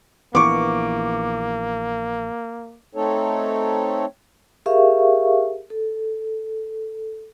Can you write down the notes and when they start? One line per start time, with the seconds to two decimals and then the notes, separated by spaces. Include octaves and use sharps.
0.35 A#1 E3 A#3 B3 C#6 D6
2.95 A3 C4 D#4 A4 C#5
4.66 G4 G#4 A#4 E5 F5 C#6
5.70 A4